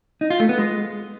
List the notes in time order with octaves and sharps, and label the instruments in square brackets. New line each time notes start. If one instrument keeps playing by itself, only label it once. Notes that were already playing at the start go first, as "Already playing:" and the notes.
[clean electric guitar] D#4
F4
A3
B3
G#3